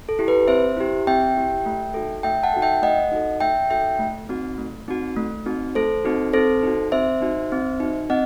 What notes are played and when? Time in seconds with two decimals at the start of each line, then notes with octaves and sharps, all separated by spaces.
0.09 A4
0.19 E4 G4
0.28 B4
0.48 C4 C5 E5
0.77 E4 G4
1.07 C4 E5 G5
1.37 E4 G4
1.66 A3
1.94 D#4 F#4 A4
2.23 A3 E5 G5
2.43 F#5 A5
2.54 D#4 F#4 A4
2.62 E5 G5
2.82 A3 D#5 F#5
3.12 D#4 F#4 A4
3.40 A3 E5 G5
3.70 D#4 F#4 A4 E5 G5
3.99 A3
4.29 C4 D#4 F#4
4.58 A3
4.88 C4 D#4 F#4
5.16 A3
5.46 C4 D#4 F#4
5.75 A3 A4 C5
6.05 C4 D#4 F#4
6.33 C4 A4 C5
6.63 D#4 F#4
6.92 C4 C5 E5
7.22 D#4 F#4
7.52 C4
7.80 D#4 F#4
8.10 C4 D#5 F#5